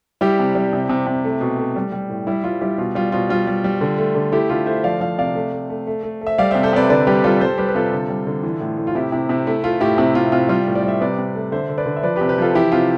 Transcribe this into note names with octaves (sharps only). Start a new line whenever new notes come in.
G3 E4 G4
C3
G3
C3
C3
C3
A3
B2
A3
G3
G3
A2
G3 E4
G3 F4
G3 E4 G4
B2 F4
G3 F4
B2 F4
G3 F4
G3
G3
D3
A3
D3
A3 E4 G4
D3 F4
A3 C5 E5
F3 D5 F5
F3 D5 F5
C3 D5 F5
A3
A3
A3
A3
A3
A3
E5
G3 D5 F5
C3 C5 E5
A4 C5
C3 B4 D5
D3 B4 D5
G3 G4 B4
G3 F4 A4
G3 A4 C5
G3 G4 B4
B4
C3 F4 A4
D3
G3
D3
E3
A2
A2
F4
C3 E4 G4
C3 E4
C3 E4
A3 E4
A3 F4
A2 E4 G4
C3 E4
C3 F4
C3 F4
G3 F4
A2
D5
G3
E5
C3 B4 D5
C3
A3
D3 C5 E5
D3
B4 D5
D3
E5
F3 B4 D5
G4 B4
C3
G4 B4
F3 F4 A4
E3 E4 G4
C3 F4